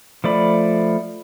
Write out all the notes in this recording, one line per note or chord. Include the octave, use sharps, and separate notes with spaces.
F3 A3 D5 B5